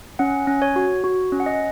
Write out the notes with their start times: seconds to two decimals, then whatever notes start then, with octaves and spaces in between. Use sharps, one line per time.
0.19 C#4 F#5
0.47 C#4
0.62 C#5
0.76 F#4
1.04 F#4
1.32 C#4
1.40 F#5
1.46 D#5